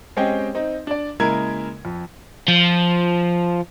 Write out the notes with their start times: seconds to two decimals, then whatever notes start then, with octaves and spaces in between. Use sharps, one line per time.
0.16 G#3 C4 C#4 G4 D#5 G5
0.55 C4 D#4
0.87 D4 D5
1.20 C#3 G#3 A#3 E4 A#4 G#6
1.85 F2
2.48 F3